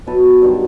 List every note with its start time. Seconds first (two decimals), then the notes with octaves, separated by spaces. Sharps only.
0.07 B2 F#3 A4 B4
0.42 G2 D#3 F#3